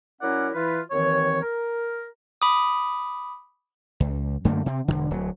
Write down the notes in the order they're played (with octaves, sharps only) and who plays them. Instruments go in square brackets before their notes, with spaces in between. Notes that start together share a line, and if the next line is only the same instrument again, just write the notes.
[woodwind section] F#3 C#4 E4 A#4 D5 F#5
E3 E4 F4 B4
D#2 D#3 E3 C4 C#5
A#4
[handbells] B5 D6 D#6
[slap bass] C#2
F#2 D3 A3 A#3
C3 C4
E1 F2 D3
D1 F#3